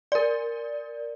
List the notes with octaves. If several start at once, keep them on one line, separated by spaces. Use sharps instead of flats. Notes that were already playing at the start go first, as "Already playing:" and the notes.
A#4 D5